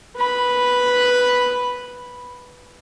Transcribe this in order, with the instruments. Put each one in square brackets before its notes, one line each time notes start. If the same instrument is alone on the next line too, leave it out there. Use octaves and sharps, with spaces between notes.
[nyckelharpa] B4 B5